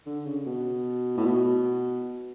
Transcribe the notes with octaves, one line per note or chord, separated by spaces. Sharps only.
D3
C#3
B2
A2
B2